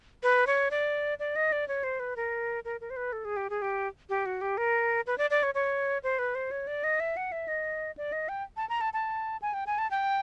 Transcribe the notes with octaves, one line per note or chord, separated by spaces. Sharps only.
B4
C#5
D5
D5
D#5
D5
C#5
C5
B4
A#4
A#4
A#4
C5
B4
A4
G#4
G4
G#4
G4
G4
F#4
G4
A#4
B4
D5
D5
C#5
C#5
C5
B4
C5
C#5
D5
D#5
E5
F#5
E5
D#5
D5
D#5
G5
A5
A#5
A5
A5
G#5
G5
G#5
A5
G5